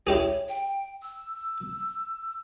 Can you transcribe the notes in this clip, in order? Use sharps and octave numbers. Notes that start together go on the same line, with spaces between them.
E4 G4 G#4 C#5
G5
E6